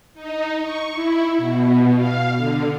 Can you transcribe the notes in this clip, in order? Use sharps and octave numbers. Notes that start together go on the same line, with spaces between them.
D#4
C#6
E4
B2
F5
D3